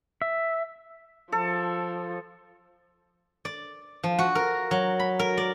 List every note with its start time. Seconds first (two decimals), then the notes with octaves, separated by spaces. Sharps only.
0.22 E5
1.32 F3 A4
3.45 D5
4.03 F3
4.19 F#4
4.35 A#4
4.71 F#3
4.99 B5
5.19 A#4
5.37 D5